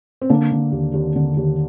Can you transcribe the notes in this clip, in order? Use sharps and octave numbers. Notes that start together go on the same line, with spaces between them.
C4
D3 A#3 D4
D3
D#2
D#2
D3
D#2